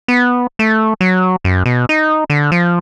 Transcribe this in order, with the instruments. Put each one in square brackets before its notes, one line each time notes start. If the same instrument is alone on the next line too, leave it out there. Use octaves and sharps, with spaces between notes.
[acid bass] B3
A3
F#3
F#2
B2
D#4
D3
F3